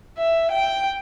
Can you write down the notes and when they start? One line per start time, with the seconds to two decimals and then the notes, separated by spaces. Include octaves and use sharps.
0.18 E5
0.51 G5